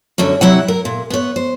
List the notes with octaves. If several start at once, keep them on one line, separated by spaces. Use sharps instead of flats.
F#2 D3 F#3 C#4
C3 F#3 E4 F#5
A#4
A#2
B3 C#5
C5